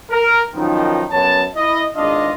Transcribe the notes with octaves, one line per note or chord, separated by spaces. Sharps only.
A#4
F#2 D#3 F3 B3 C4 D#4
F#2 B3 C#5 A5
E4 D#5
G#1 E2 D4 F4 D#5